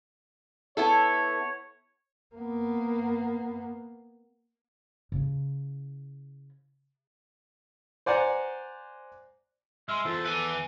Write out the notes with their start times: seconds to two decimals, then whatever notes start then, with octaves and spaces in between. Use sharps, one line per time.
0.77 B3 E4 A4 C#5
2.36 A#3 B3
5.12 C#3 E4
8.06 C5 D5 F#5 G#5 A#5
9.89 G#3 E5 C6 F6
10.05 E2 F4 A4 C5
10.26 B4 E5 G#5